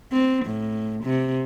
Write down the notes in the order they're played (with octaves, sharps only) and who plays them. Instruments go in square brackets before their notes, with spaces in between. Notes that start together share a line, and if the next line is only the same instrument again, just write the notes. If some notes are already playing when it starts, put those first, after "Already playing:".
[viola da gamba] C4
A2
C3